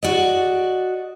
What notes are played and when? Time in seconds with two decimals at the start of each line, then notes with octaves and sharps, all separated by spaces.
0.03 F#4 D5 D#5